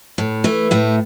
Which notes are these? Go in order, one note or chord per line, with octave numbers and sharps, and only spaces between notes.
A2
E3 A3
A2 A3